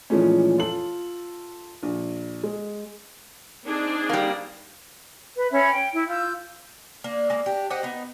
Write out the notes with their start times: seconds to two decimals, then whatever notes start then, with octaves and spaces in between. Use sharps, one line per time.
0.10 A#2 E3 F3 G#3 A3 C#4
0.58 F4 A4 F#7
1.83 A#1
2.44 G#3
3.66 C4 D4 D#4 G#4
4.09 G3 A#3
5.37 B4
5.51 C#4 C#5 E5 B5
5.70 G5
5.94 E4
6.08 F4 E6 G6
7.04 A#3 D4
7.30 G#3 A#3
7.46 D4 G4
7.70 G4 C5 D#5 F#5
7.83 B3 D#4